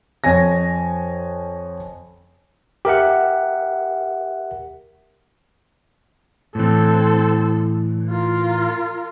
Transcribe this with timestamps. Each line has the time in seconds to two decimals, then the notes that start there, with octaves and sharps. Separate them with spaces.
0.24 F2 C#5 G#5 A#6
2.85 G4 A#4 E5 F#5
6.55 A2 E3 C4 A4
8.10 F4 A#4